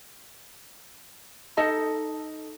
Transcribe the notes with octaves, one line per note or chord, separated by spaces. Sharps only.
D#4 A4 D#5 A5